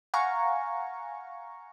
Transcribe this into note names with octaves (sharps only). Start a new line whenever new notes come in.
F5 F#5 G#5 A#5 C#6